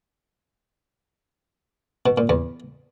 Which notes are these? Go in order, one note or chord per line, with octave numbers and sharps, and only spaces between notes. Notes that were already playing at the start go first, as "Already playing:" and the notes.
B2
A#2
E2